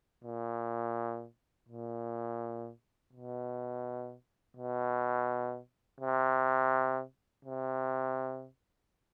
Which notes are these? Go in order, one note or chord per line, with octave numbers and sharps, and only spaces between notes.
A#2
A#2
B2
B2
C3
C3